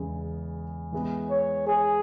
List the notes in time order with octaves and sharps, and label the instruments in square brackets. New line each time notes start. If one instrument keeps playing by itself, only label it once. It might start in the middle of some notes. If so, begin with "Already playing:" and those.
Already playing: [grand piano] E2 C#3 G#3
E3 G#3 B3
[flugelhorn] C#5
G#4